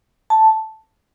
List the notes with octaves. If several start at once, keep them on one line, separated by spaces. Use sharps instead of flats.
A5